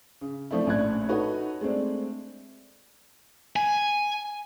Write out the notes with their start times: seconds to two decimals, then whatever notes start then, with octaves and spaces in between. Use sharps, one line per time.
0.21 C#3
0.51 F3 A3 C4 D4 E4
0.67 A#1 A2 C#4 D4 F#6 G#6
1.09 D#4 F#4 A4 B4 C#5
1.61 G#3 A3 C4 D4
3.56 G#5